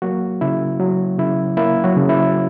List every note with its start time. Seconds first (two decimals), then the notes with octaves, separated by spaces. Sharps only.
0.02 F#3 A#3 F#4
0.41 C#3 E4
0.80 F#3 F#4
1.18 C#3 E4
1.57 A#3 E4
1.84 F#3 F#4
1.97 C#3
2.09 E4